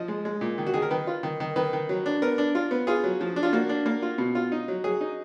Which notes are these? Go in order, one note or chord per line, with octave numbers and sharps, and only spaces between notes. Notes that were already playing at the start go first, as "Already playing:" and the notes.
Already playing: F3 D#5
G#3
G#3
A#2
D#3
F#4
D#3 G#4
A#4
D#3 B4
F4
D#3
D#3
D#3 B4
D#3
F#3
D4
B3 A#4
D4
F4
B3
F4 G#4
F#3
F3
D4
F4
A#3 F#4
D4
A#3
F4
B2
F4
D#4
F#3
F#3 G#4
D#4